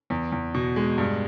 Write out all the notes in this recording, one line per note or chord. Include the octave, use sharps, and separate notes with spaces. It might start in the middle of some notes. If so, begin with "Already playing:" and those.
E2
E2
B2
G#3
G2